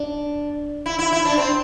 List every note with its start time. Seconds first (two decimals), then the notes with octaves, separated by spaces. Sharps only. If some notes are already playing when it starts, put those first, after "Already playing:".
Already playing: D4
0.86 E4
0.99 E4
1.13 E4
1.25 D4
1.37 C4